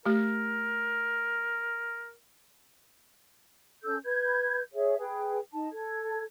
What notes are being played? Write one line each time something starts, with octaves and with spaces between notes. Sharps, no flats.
A3 G4 A#4
C#4 A4 E6 G6
B4 G6 G#6
G#4 C#5 E5
G#4 B4 G5
D#4 A5
A4 G#6